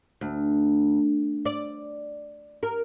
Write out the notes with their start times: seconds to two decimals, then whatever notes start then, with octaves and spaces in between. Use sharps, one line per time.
0.21 D2
1.45 D5
2.63 A#4